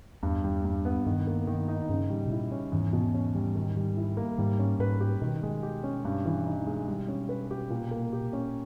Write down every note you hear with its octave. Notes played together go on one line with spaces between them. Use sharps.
E2 G2
G3
G2
B3
G2 D#3
A#3
D#3
D#4
G2 C#3
G#2 G3
B2
A#2 E4
C#4
E2 G#2
B2
C#4
G3
D#3
G3
E4
A#3
G#2 G3
C#4
G#2 B4
G4
B2 D#3
G#3
G4
C#4
G2
E3
D#4
G#3
G3
C#4
B4
G4
A#2
A#3
G4
C#4